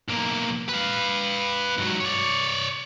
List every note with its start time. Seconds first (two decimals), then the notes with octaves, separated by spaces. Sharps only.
0.08 B1 A#3
0.69 B4 F5
1.78 G#2 F#3
2.00 C#5 D5